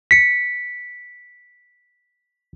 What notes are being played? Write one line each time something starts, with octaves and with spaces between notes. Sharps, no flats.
B6 C#7